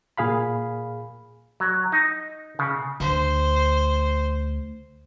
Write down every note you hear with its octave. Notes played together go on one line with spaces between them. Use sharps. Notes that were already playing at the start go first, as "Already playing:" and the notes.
A#2 G#4 F5 B5
F#3
D#4
C#3
D2 C5